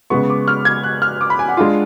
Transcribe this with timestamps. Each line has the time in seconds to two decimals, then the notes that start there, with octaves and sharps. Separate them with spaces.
0.10 C#3 G#3 B3 C#6
0.30 D6
0.48 F6
0.65 G#6
0.83 F#6
1.02 F6
1.21 D6
1.30 B5
1.39 G#5
1.48 F#5
1.57 G#3 D4 F4